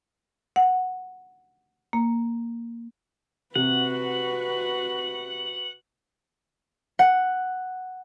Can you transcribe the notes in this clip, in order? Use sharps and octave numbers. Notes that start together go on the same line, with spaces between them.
F#5
A#3
C3 F#4 B4 F#5
F#5